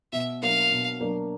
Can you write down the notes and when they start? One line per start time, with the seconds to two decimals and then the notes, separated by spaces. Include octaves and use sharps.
0.13 B2 E5
0.42 F#3 A#3 D4 F5
0.71 B2
1.01 F#3 A#3 D4